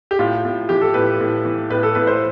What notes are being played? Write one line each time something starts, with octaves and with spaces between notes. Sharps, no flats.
G4
A2 F4
A2
E3 G4
A4
A2 B4
A2
E3
A2 B4
A4
A2 B4
C5